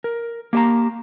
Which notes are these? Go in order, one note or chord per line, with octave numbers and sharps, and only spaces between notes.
A#4
A#3 G4 D#5 A5 A#5